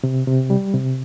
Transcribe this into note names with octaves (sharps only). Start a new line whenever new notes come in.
C3
C3
G3
C3